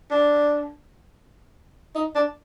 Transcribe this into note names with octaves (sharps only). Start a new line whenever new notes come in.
D4
D#4
D4